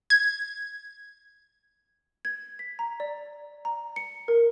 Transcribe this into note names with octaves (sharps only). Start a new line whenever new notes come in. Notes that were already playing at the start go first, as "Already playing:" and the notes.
G#6
G#6
B6
A#5
D5
A#5
C#7
A#4